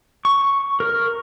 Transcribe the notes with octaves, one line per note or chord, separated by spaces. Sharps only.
C#6
A#4